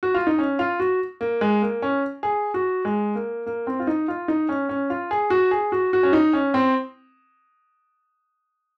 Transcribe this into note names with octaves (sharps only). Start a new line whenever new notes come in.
F#4
F4
D#4
C#4
F4
F#4
A#3
G#3
A#3
C#4
G#4
F#4
G#3
A#3
A#3
C4
F4
D#4
F4
D#4
C#4
C#4
F4
G#4
F#4
G#4
F#4
F#4
C#4
D#4
C#4
C4